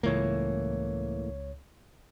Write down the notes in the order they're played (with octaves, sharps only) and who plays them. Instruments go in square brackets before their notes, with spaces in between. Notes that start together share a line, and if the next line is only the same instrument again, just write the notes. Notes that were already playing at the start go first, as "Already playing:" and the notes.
[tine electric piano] C#2 C#5 [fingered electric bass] A2 E3 A#3